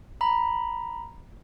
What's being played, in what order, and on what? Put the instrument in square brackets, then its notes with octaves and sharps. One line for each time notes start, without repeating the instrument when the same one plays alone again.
[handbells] A#5 B5